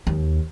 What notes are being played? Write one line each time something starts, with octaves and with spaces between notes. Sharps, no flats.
D#2